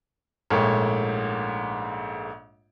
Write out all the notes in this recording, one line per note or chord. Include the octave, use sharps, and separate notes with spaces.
A#1 G#2 A3 A#3 C#5 G5